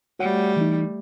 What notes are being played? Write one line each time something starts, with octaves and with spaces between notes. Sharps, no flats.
G3 A3 F#4 C#5 F#5
E3 D#4